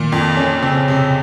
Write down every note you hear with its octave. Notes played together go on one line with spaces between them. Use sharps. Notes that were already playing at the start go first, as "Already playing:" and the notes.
Already playing: A#2 D#3
F2
C#4
C#3 C4
C3